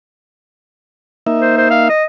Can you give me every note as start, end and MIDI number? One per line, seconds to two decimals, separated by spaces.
1.27 1.89 58
1.27 1.89 63
1.27 1.89 76
1.41 1.54 72
1.58 1.69 72
1.71 1.87 77
1.89 2.04 75